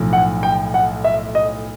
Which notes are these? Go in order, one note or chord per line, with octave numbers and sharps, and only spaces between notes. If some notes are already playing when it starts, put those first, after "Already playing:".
Already playing: B1 A2 F3
F#5
G5
F#5
E5
D#5